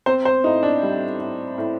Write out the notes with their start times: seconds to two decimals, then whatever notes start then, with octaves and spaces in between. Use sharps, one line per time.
0.06 C4 C5
0.25 C5
0.44 A2 D#4
0.63 D4
0.83 G3
1.20 A2
1.58 A2